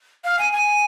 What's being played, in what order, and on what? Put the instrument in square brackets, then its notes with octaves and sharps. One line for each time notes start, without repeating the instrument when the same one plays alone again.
[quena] F5
G#5
G#5